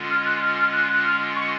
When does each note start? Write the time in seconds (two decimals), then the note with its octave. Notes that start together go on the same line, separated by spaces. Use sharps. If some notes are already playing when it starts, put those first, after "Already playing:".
Already playing: D3 G#3 C#4 F4
0.10 F6
0.25 F#6
0.41 F6
0.56 F6
0.72 F#6
0.88 F#6
1.04 F6
1.35 C#6